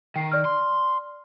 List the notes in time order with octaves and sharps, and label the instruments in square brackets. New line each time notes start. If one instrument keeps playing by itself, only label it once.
[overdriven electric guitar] D#3 [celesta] G5 C7
[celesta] D5 F6
[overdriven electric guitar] C6